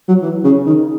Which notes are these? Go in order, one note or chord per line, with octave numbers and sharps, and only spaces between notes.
F#3
E3
C#3
D#3